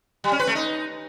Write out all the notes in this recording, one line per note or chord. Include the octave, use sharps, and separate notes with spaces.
G3
C#4
B4
A3
D#4